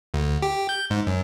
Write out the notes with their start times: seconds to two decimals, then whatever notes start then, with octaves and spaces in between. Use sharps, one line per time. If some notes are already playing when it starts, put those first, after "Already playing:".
0.14 D2
0.42 G4
0.69 G6
0.90 G#2
1.07 F#2